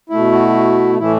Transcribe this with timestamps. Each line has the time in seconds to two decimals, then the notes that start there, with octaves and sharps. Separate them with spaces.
0.10 B2 A3 E4
0.32 F#4
0.98 A2 E3 A3 E4